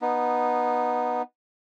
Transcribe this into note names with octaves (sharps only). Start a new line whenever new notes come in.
B3 D#4